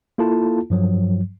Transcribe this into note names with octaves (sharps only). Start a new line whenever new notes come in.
A#3 E4 F4 A4 A5
G2 F3 F#3